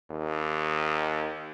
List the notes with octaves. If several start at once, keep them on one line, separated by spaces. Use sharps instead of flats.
D#2